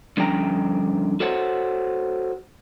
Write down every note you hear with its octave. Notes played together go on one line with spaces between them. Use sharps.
G2 D3 F3 C#4 G5 A#5
F#4 A4 C5 C#5 F#5